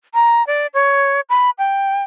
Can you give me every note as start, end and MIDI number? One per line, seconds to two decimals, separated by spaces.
0.14 0.45 82
0.47 0.67 74
0.74 1.20 73
1.29 1.50 83
1.58 2.03 79